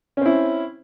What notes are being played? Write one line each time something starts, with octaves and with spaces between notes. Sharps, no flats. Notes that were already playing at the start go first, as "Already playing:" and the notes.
C4 C#4 E4